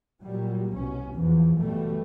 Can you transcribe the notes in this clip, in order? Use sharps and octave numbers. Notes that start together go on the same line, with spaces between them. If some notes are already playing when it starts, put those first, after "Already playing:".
A#2 F#3 G3
C2 B2 C#4
E2 E3 F3
F#1 B2 E3 G3 A3